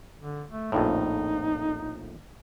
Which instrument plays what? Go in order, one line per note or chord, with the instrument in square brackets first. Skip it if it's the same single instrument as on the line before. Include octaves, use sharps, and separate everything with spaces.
[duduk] D3
A3
[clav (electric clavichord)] A#1 F2 A2 [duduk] D#4